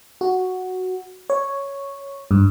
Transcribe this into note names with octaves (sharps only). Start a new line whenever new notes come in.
F#4
C#5
G2